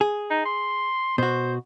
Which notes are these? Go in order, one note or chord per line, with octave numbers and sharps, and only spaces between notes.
G#4
D#4
C6
B2 F#4 C5